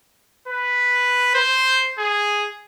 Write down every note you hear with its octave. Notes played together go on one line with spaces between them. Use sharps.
B4
C5
G#4